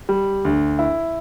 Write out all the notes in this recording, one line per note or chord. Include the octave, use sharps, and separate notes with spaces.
G3
D2
E4